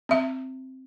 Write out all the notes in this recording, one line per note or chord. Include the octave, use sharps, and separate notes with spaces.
C4 E5